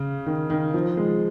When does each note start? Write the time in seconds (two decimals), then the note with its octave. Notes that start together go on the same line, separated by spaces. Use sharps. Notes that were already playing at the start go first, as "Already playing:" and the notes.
Already playing: C#3
0.26 D#3
0.50 D#3
0.74 F3
0.97 G#3